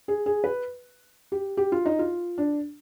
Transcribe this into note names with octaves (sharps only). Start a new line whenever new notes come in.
G#4
G#4
B4
G4
G4
F4
D#4
F4
D4